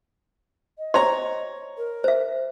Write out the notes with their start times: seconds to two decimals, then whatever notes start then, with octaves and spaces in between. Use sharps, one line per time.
0.78 D#5
0.94 C5 C#5 A#5 C6
1.77 A#4
2.04 C5 E5